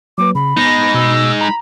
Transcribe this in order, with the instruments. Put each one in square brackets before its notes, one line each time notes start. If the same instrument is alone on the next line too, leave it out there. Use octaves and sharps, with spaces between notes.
[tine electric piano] F#3 A#3 B4 [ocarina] D6
[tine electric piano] C#3 [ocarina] B5
[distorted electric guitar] G#3 D#4 [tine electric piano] B3 [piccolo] A#6
[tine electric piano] B2 [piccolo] E6
[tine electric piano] A#5 [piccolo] B5